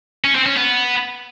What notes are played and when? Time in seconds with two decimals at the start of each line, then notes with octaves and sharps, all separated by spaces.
0.24 C#4
0.35 C4
0.46 C#4
0.57 B3